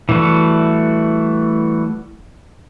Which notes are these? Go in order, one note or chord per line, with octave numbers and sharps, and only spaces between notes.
E3 G3 A3 F#4